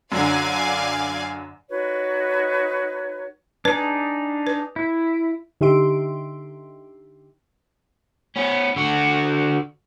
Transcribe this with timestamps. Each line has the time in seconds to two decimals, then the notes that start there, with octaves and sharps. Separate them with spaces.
0.12 F#2 D3 D5 F5 G#5
1.69 D#4 F#4 B4 C#5
3.65 D4 D#4 G#4 B4
4.47 B4
4.76 E4
5.61 D3 D#4 G4 E5 C6 D7
8.36 B3 C#4
8.76 D3 F#4